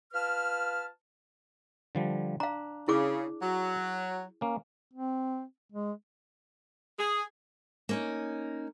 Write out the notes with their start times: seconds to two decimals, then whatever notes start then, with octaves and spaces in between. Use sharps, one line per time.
0.13 F4 B4 A5 F6
1.95 D3 F3 G3
2.40 D4 F5 A#5
2.88 C#3 E4 G#4 D6
3.41 F#3
4.41 A#3 C#4
4.93 C4
5.73 G#3
6.99 G#4
7.89 A#3 C#4 D#4